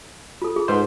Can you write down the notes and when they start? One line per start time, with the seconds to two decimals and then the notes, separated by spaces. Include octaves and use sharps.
0.42 F4 A4
0.56 F4 G#4
0.68 G#2 B4 C5 D#5